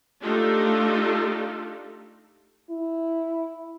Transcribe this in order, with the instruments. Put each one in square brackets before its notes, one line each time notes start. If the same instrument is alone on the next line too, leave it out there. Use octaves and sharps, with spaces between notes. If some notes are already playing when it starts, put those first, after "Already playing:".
[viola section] A3 D4 D#4 F4 G4 A4
[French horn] E4